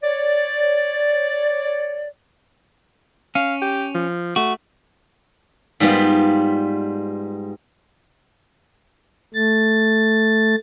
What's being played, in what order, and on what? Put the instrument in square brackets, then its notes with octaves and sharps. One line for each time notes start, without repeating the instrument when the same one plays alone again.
[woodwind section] C#5 D5
[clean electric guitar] C#4 [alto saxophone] F5
[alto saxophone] G4
F3
[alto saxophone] A3 [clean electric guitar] F#4
[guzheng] G#2 G3 B3 F4
[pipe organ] A3 A6